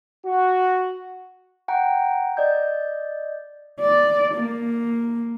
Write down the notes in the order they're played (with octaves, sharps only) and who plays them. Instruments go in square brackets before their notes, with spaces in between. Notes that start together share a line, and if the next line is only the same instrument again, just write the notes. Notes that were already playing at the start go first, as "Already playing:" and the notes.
[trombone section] F#4
[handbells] F#5 G5 A#5
D5 D#5 G6
[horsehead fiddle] D5
A#3